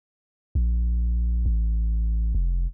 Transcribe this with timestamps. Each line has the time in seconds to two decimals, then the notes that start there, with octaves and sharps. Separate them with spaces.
0.55 A#1
1.46 A1
2.35 F1